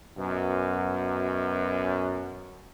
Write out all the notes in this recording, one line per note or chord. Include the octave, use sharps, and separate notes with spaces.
F#2 B2